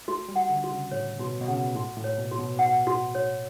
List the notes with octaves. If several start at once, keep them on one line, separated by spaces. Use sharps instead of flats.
A3 F#4
G3
F#5
D3
F#4
C#3
A2 C#5
B2 F#4
B2
C#3 F#5
A2 F#4
A2
C#5
B2
F#4
B2
F#5
F#4
C#5